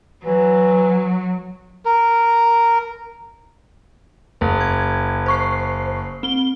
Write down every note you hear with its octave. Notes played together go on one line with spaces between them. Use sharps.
E3 F#3
A#4
F#1
G#6
C5 C#6 C7
C4 G7